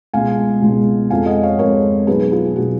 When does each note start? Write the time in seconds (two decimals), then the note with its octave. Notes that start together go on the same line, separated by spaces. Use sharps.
0.14 C#2 B2 G#3 F5 G#5
0.62 C#2 B2 G#3
1.10 F2 F3 G#3 F5 G#5
1.26 D#5 F#5
1.43 C#5 F5
1.59 F2 F3 G#3 A#4 C#5
2.07 B1 B2 F#3 G#4 B4
2.32 F4 G#4
2.56 B2 F#3 F#4